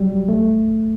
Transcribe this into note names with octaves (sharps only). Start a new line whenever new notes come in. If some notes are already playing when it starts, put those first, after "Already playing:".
Already playing: F#3 G3
A3